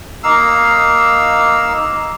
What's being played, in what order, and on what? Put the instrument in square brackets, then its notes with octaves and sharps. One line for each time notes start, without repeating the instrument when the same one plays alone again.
[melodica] A#3 D#4 F5 E6